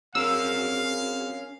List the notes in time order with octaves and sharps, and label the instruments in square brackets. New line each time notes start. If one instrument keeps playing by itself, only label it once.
[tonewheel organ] C4 F#4 G#4 [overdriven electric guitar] C#4 A#4 [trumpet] F5 [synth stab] E6